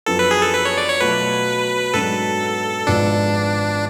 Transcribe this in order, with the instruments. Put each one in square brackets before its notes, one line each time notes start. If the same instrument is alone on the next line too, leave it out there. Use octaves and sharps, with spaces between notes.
[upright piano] F#2 F3 B3 D4 [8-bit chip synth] A4
[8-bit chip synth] B4
G#4
A4
B4
C#5
D5
C#5
[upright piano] B2 F#3 A3 F4 [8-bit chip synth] B4
[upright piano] G#2 F#3 B3 D4 [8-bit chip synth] A4
[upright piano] G#1 G#2 F3 B3 [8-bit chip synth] D4